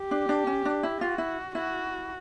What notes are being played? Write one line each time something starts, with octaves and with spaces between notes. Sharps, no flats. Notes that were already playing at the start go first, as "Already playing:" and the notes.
Already playing: G4
D4
D4
C#4
D4
E4
F4 F#4
E4
E4 F#4